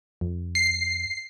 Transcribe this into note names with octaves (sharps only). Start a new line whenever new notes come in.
F2
C7